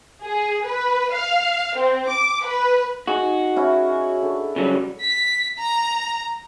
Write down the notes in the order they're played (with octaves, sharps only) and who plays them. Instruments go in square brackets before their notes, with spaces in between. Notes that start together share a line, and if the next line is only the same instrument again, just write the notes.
[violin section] G#4
B4
F5
C4
D6
B4
[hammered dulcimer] D#4 G#4 [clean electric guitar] F#4
[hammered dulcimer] C#4 E4
D3
[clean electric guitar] C#3 F#3 G3
[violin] B6
A#5